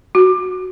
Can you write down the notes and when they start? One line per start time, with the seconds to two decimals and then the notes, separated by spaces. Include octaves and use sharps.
0.15 F#4